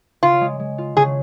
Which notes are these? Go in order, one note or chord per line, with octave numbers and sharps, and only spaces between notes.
C#3 F4
G#3
G#3
F4
C#3 G#4